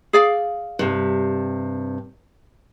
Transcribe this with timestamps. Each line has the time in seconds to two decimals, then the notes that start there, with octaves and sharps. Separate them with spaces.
0.13 G#4 D5 F5
0.79 G2 C3